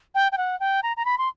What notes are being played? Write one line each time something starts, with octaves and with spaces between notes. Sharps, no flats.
G5
G5
F#5
G5
A#5
A#5
B5
C6